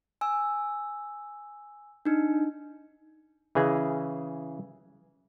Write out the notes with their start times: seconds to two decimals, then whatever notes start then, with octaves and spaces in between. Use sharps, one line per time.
0.21 G#5 E6
2.05 D4 D#4
3.55 C#3 E3 G#4 D#5